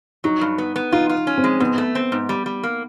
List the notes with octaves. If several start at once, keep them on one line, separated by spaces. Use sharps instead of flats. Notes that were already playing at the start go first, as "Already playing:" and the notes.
F#3 D#4
G2
B3
B3
D#4 F4
F4
C#4
C4
G#3
G#2 B3
A3
C4
G#2
G3
G3
A#3